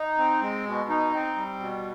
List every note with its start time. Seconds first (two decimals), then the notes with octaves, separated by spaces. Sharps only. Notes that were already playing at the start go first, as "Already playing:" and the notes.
Already playing: D#4
0.18 C4
0.41 G#3
0.65 B2
0.89 D#4
1.13 C4
1.36 G3
1.60 B2